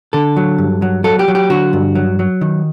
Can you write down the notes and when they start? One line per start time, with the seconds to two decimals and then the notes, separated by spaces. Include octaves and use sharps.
0.13 D3 A4
0.36 F#3
0.58 G2
0.82 F#3
1.04 F#3 A4
1.19 G4
1.28 F#3
1.35 G4
1.50 D3 F#4
1.73 G2
1.95 F#3
2.19 F#3
2.41 D#3